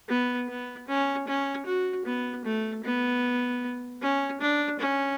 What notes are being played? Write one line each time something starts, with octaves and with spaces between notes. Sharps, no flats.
B3
B3
C#4
C#4
F#4
B3
A3
B3
C#4
D4
C#4